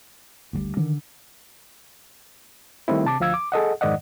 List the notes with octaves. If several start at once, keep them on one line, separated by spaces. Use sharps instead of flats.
F#1 D2 F#3 G3
D3 D#3
D#3 G3 A3 C4 E4
C3 A5 D6
D2 F3 F5 E6 G#6
D6
G#4 A4 D#5 F#5
F2 G#2 D#3 D5 D#5 F#5